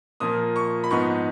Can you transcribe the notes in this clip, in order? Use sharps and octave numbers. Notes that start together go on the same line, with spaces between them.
A#2 F3 A#3 D#6
C#6
B5
G#2 F3 B3 D#4 C#6